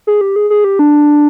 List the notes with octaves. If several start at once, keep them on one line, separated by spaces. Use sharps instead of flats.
G#4
G4
G#4
G#4
G4
D4